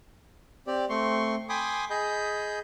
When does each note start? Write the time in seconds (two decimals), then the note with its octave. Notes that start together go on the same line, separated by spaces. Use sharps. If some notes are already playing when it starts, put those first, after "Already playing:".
0.67 C4 G4 D5
0.90 A3 C4 C6 C#6
1.49 G5 G#5 B5 C6 D6 D#6
1.90 G#4 D#5 B5 G6